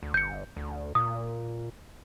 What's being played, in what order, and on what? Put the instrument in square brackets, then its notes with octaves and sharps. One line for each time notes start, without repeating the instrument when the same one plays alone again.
[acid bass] D2
[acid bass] G1 [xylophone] G6 C#7
[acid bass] D2
[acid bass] A#2 [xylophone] D#6